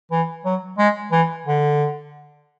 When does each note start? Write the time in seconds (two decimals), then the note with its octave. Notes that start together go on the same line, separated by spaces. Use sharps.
0.11 E3
0.45 F#3
0.78 G#3
1.12 E3
1.46 D3